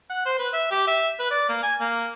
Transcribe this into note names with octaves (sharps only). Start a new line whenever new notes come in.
F#5
C5
B4
E5
G4
E5
B4
D5
A#3
G#5
A#3